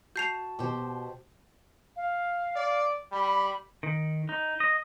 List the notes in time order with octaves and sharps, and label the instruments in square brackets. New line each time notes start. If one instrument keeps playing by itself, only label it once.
[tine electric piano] F#4 A5 [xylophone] G6 C7 F7
[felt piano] B2 [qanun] G4 C5
[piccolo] F5
[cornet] D5
[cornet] G3 [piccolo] B5
[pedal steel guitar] D#3
D#4
D#5